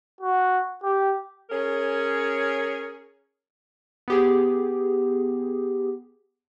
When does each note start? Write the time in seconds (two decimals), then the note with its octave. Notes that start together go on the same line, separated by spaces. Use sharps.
0.21 F#4
0.83 G4
1.50 C#4 G#4 A#4 C#5
4.08 B3 G4 G#4